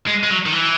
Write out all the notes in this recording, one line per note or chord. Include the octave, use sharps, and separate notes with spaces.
G#3
G#3
F#3
D#3
E3